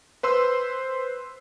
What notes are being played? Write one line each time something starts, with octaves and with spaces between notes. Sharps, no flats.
B4 C5 C6 E6